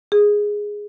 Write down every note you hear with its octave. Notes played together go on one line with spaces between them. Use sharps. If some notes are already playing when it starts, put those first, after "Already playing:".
G#4